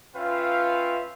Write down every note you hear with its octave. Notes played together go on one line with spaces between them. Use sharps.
C#4 F4 B4 E5 F5 G5